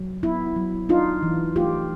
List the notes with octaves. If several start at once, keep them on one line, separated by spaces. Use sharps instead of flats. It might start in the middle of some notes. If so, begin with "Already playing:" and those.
Already playing: F#3
B3 E4
F#3
D4 D#4 F4
E3
A3 F4 G4